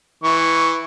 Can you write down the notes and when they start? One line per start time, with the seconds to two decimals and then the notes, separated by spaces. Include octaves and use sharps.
0.24 E3 C#6